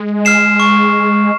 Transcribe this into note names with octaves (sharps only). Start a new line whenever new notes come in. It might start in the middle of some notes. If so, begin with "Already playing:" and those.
Already playing: G#3
F6 C7 E7
C#6